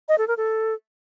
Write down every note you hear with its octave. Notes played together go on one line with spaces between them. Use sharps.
D#5
A4
A#4
A4